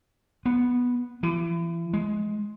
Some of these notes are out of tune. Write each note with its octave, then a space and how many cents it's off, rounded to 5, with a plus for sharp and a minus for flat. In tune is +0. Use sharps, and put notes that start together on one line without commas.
B3 -5
E3 +35
G#3 +15